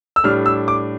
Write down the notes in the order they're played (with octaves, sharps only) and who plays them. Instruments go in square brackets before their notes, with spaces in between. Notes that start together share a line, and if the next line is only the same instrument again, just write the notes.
[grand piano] E6
A2 G3 D4 F6
E6
D6